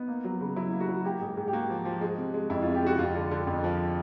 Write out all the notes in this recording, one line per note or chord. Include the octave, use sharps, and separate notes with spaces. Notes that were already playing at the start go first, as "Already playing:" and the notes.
Already playing: B3 D#4
A#3
F#3
C#3
F#3 E4
A#3
F#4
F#3
A#3 G4
G#2 G#4
G#2 G4
G4
A#3 F#4
F3
F3
G#3
C3
G#3
F2 E4
F4
C3
G4
G#3 F#4
F2 F4
D3
D3
F2
F3